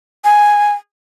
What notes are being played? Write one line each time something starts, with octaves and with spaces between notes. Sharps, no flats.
G#5